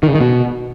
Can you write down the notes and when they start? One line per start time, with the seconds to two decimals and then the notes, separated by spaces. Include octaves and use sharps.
0.03 D#3
0.09 C#3
0.15 D#3
0.21 B2